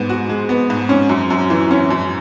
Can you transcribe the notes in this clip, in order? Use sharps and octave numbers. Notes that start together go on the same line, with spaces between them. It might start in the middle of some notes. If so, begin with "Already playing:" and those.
Already playing: G#2 B3
F#4
G#3
B3
G#2
C#4
F#2
F#2
E3
C#4
F#2